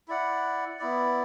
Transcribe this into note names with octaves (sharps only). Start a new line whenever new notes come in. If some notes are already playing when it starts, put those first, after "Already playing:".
E4 D5 F#5
B3 E4 D5